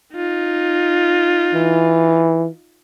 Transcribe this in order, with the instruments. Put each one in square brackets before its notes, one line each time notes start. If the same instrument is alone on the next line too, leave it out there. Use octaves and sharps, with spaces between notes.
[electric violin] D#4 F4
[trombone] E3